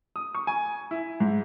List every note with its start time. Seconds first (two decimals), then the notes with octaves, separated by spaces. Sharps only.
0.16 D#6
0.35 C#6
0.47 G#5
0.91 E4
1.20 G#2